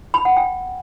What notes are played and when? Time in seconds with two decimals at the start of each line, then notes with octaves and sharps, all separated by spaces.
0.14 B5
0.25 F#5
0.37 G5